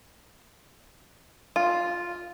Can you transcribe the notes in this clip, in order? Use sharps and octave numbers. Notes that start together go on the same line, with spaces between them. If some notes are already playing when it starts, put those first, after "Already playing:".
F4